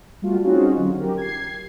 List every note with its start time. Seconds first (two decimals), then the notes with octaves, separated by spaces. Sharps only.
0.22 G3 A3 F4 F#4
0.44 C4 C#4 D#4 F4 F#4 G#4
0.77 D3 F#3
0.99 G4 A#4
1.17 G#6 C7